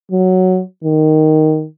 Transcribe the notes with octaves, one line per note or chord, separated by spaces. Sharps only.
F#3
D#3